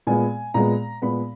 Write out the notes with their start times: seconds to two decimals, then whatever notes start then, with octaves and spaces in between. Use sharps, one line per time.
0.07 A#2 G#3 B3 G#5
0.54 A#2 G#3 B3 A#5
1.02 A#2 G#3 B3 B5